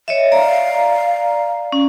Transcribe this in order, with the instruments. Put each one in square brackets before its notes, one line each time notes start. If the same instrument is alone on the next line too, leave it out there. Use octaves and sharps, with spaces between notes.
[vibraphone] C#5 D#5 E5
[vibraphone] D5 A#5 [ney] F5
[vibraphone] C#4